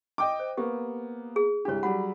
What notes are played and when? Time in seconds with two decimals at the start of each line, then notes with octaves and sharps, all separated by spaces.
0.18 D#5 G5 D6
0.39 C5
0.57 A#3 B3 G4
1.36 G#4
1.65 C2 D4 G4 C#5
1.83 F#3 G3 F#5 B5